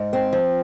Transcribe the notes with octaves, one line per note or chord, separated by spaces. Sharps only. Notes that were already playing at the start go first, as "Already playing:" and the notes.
Already playing: G#2
C4
F3